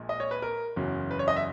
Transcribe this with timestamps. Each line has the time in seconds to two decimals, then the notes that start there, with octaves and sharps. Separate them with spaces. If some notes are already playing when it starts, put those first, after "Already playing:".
Already playing: A#1 A#2 G#3
0.09 D#5
0.20 C#5
0.31 B4
0.42 A#4
0.76 F#1 E2 C#3 F#3
1.11 B4
1.19 C#5
1.28 D#5
1.36 E5